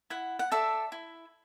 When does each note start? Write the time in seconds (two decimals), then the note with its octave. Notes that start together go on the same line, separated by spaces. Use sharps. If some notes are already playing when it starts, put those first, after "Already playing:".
0.10 E4 F#5
0.39 F#5
0.52 A4 D5 E5
0.92 E4